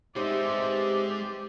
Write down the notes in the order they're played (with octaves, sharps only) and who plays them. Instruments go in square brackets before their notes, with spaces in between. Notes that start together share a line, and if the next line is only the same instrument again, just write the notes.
[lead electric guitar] G#3 C5 [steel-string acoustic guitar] B3 C4 D#4 [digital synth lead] G4 [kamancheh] D5 E5